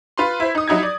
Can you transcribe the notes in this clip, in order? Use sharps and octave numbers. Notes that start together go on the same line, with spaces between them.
F4 B4 C6
E4 C5
D#4 D#6
F#3 D#4 E4 G#6
D5